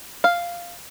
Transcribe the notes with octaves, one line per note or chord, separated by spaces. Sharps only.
F5